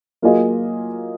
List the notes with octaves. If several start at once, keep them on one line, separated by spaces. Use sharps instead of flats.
F#3 A#3 F4 G#4 D#5